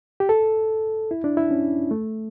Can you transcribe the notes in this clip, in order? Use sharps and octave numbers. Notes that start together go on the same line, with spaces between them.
G4
A4
E4
D4
E4
C#4
A3